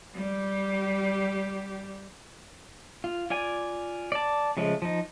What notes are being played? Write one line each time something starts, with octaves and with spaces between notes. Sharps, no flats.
G3 G4
F4
F4 D5 G#5
D5 A5
C#3 F3 G#3 A3
F3 D#4